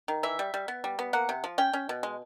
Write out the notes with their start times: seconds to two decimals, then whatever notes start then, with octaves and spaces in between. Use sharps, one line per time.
0.08 D#3
0.23 E3 E5
0.39 G3
0.54 G3
0.68 B3
0.84 G3
0.99 B3
1.13 A#3 F#5
1.29 C3
1.44 F3
1.58 C#4 G5
1.73 C#4
1.89 B2
2.03 G#3